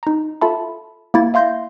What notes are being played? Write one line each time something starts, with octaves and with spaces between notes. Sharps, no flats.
D#4 A#5
F4 A4 E5 A5 B5
A#3 E4 A6
E5 F5 C6 G6 A#6 C7